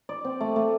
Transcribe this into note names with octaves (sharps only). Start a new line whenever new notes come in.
D5
C4
A3
A3